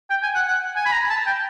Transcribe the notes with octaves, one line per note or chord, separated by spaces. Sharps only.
G5
G#5
F#5
F#5
G#5
B5
A#5
A5
G5